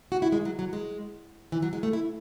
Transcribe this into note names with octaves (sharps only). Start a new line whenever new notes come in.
F#4
E4
G#3
F#3
F#3
G#3
E3
F#3
G#3
A3
E4